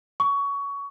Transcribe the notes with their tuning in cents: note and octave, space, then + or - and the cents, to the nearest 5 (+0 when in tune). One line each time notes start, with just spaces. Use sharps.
C#6 +20